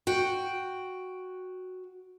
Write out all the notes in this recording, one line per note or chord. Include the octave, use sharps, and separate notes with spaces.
F#4 G5